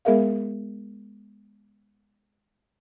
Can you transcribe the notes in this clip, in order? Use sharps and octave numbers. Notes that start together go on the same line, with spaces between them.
G#3 B3 G#4 A#4 E5 F5